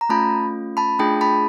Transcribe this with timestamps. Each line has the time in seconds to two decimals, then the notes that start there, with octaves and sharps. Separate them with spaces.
0.01 A#5
0.09 A3 C#4 F4 A5 B5
0.77 A5 B5
0.99 A3 D4 F4 G#4 G5 A5
1.21 A5 B5